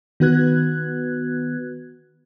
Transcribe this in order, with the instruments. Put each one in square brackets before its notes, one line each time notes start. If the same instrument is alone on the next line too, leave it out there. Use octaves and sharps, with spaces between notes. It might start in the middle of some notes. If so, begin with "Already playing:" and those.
[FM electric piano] D#3 B3 F#4 B4 F#6 G#6